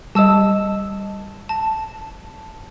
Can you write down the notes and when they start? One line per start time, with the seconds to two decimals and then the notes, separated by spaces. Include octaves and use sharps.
0.15 G3 D#5 A5 E6 E7
1.49 A5